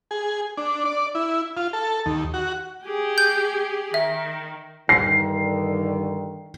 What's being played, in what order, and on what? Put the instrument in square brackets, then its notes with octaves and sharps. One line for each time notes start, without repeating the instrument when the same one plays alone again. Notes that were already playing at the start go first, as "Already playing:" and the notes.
[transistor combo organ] G#4
D4
D5
E4
F4
A4
D#2
F#4
[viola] G4 G#4
[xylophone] G6
[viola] D#3 [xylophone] E5
[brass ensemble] G2 D3 D#3 [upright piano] C7